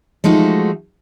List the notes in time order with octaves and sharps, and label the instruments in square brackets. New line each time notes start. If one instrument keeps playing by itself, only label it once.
[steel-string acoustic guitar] F3 G#3 A3 D#4 F#4